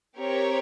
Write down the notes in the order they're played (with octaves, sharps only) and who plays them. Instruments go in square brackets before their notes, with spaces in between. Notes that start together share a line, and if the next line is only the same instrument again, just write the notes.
[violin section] C4 G4 A#4 C#5